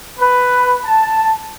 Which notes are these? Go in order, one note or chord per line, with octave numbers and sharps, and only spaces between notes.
B4
A5